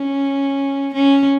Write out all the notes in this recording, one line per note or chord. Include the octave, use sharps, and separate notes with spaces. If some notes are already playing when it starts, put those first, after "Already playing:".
Already playing: C#4
C#4